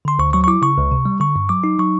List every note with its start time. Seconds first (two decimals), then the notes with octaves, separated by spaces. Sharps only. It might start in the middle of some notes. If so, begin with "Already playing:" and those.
0.05 D3 C6
0.19 D2 C#6
0.33 F#3 C#6
0.44 C#6
0.48 E4 D6
0.62 C#3 C#6
0.78 C#2
0.91 C3
1.05 G3
1.20 D3 C#6
1.36 G2
1.49 F#3 D6
1.64 D#4
1.79 F#3 C#6